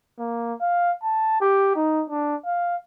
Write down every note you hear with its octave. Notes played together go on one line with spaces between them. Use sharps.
A#3
F5
A5
G4
D#4
D4
F5